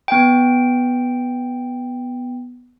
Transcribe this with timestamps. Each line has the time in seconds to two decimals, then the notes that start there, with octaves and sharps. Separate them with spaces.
0.08 B3 G5